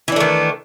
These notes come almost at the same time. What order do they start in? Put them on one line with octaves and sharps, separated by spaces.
E3 D4 A3 D#3